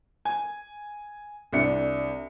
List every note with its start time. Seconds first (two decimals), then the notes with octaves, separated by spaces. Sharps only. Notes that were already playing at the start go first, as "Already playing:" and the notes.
0.25 G#5
1.53 C2 D4 C#7